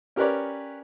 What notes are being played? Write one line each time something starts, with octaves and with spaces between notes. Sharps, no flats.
C#4 G4 A#4 B4 C#5 D5